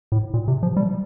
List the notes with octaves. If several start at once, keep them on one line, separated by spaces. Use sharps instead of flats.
A2
A#2
C3
F3
G3